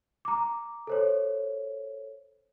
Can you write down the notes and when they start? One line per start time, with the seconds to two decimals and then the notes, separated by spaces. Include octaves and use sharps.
0.25 A#5 D6
0.87 A4 C5 C#5